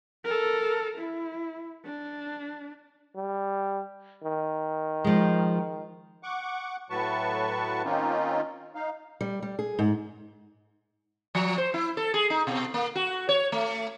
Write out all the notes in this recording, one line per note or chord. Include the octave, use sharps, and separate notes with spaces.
A4 A#4
E4
D4
G3
D#3
F3 G#3
F#5 C#6 D6
A2 F#3 B4 A5 C#6
D#3 A#3 C4 C#4 D#4 F4
D#4 F5
G3
G3
G#4
G#2
F3
C5
E4
A4
G#4
D#4
B2
A#3
F#4
C#5
A3